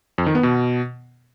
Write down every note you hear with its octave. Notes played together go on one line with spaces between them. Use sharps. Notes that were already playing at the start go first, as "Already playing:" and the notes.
F2
D#3
B3
B2